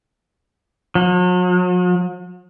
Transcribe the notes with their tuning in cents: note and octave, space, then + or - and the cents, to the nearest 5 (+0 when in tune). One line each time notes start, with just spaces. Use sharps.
F#3 -45